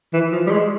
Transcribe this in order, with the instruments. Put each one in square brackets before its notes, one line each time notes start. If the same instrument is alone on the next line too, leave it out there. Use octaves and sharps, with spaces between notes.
[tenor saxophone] E3
F3
G3
G#3